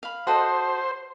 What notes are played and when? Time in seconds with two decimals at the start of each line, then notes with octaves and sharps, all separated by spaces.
0.03 F5 B5
0.27 F#4 A4 C5 D#5